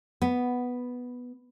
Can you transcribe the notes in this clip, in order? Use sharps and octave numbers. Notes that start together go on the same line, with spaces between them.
B3